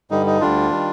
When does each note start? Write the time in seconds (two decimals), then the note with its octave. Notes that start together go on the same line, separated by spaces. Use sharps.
0.11 G2 D3 G3 D#4
0.26 D#4
0.41 D2 D3 G3 D4 F4
0.71 D#3 G3